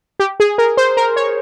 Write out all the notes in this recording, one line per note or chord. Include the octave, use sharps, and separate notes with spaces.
G4
G#4
A#4
C5
A#4
C#5